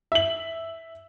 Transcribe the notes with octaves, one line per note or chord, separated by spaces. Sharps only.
E5 F#7